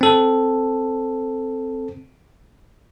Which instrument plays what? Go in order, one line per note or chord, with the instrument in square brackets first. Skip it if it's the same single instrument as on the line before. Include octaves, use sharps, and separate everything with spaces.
[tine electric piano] C4 A4